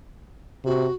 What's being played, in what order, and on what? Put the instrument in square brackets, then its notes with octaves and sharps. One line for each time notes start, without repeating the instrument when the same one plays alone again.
[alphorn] C3 [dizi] F#4